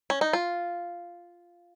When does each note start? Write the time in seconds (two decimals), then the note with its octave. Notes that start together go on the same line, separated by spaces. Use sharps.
0.10 C#4
0.21 D#4
0.33 F4